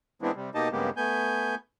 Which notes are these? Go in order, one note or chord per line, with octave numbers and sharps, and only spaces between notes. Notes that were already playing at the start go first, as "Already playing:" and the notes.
E3 G#3 B3 C4 D4 E4
C3 G3
B2 A#3 D#4 G4 D#5 A5
G2 C#3 G#3 A#3 B3 G4
A3 B3 G#5 G6